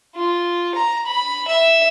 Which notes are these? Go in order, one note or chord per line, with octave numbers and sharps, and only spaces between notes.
F4
A#5
B5
E5